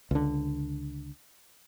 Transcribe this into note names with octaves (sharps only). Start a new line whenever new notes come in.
C#2 D3